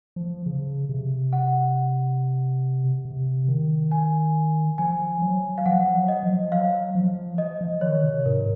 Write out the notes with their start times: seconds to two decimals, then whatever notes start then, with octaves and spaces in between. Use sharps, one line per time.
0.16 F3
0.46 C#3
0.89 C3
1.33 F#5
3.05 C3
3.48 D#3
3.91 G#5
4.78 F3 G#5
5.22 F#3
5.58 F5
5.66 F3 F#5
5.94 F#3
6.08 D#5
6.23 F3
6.52 F#3 F5
6.95 F3
7.38 D#5
7.61 F3
7.81 D#3 C#5
8.03 C3
8.25 G#2 A#4